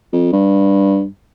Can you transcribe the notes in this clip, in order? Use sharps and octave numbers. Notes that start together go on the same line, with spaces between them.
F2
G2